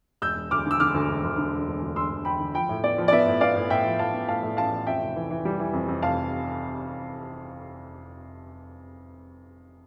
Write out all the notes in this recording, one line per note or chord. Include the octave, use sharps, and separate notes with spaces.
E1 E6 G6
E1
D2 D6 F6
D3 E6
D3 D6 F6
D2
E1
D2
D3
E1
E1
D2
E1 C6 E6
E1
E1 G5 B5
D3
F3 G5 B5
A2
B3 D5
F3
D5
B3 E5
A2
B3 D5 F5
A2
A2 E5 G5
F3
A2 F5 A5
B3
A2 F5 A5
A2
A1 F5 A5
A1
F2 E5 G5
F1
E3
E3
G3
E3
F2
F2
F1 F5 A5